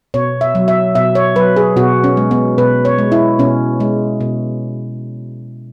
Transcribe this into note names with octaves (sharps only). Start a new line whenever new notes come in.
B2 C#5
E5
F#3
E5
B2 E5
C#5
F#3 B4
G#4
B2 F#4
C#4
G#3
B3
B2 B4
C#5
G#3
E4
B2 C#4
G#3
B2